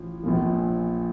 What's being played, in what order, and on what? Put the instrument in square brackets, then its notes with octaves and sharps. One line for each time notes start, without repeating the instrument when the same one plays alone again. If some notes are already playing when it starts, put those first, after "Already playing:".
Already playing: [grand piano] A1 F3
A#1 A#2 F3